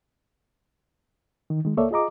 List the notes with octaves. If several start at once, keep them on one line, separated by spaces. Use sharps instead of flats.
D#3
D#3 G#3
C#2 A#3 A4 C#5 D5 E5
F4 G#4 D#5 A#5 D6